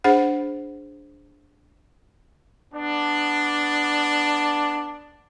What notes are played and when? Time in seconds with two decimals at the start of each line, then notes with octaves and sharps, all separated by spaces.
0.04 D4 G#4 C5 F#5
2.74 B3 D4